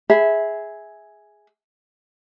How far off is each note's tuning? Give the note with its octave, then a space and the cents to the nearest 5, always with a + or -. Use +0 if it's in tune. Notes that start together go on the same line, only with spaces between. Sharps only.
G#4 +0 E5 -15 B5 +20